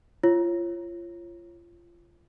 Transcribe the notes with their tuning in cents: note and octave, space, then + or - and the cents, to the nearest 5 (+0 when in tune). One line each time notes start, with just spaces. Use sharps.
F4 -25 C#5 -20